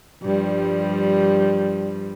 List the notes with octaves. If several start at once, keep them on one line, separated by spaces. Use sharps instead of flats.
G2 F3 G3